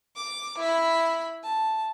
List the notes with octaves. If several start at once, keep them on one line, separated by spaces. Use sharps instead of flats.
D6
E4 B5
A5